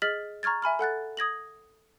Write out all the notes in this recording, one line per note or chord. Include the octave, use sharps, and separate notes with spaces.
G#4 D#5 F6 A6 B6 F#7
A#5 C#6 F6 G#6 A6
E5 G#5 B5 F6
A4 F#5 F#6 A6
D#6 G#6 A#6 F#7